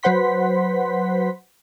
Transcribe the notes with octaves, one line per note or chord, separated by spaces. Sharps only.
F#3 B4 C5 F#5 C6 B6